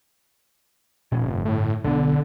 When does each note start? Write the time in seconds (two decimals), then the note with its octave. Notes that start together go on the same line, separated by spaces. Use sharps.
1.12 F1 A#2 C#4
1.28 G1
1.45 A2
1.84 B1 D3 B3